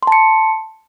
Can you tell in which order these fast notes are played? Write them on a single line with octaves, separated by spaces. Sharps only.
C6 A5 C#7